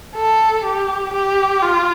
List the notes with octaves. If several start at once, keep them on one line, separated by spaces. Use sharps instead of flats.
A4
G4
G4
F4